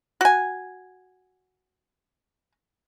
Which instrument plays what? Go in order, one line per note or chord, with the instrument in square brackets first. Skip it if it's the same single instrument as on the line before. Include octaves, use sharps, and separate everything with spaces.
[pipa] F#4 G#5